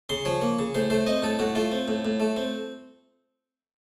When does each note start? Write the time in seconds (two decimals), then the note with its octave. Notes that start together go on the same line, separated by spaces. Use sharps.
0.09 C#3 C6
0.25 F3 C#5
0.42 A#3
0.59 C#3
0.75 A2 C5
0.90 A3 C5
1.06 C4 D#5
1.22 A2 A4
1.39 A2 F#4
1.55 A3 F4
1.72 C4
1.88 A2
2.05 A2
2.20 A3
2.36 C4